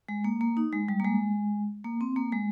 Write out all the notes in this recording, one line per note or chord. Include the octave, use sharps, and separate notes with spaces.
G#3
A#3
A#3
D#4
G#3
G3
A#3
G#3
A#3
C4
A#3
G#3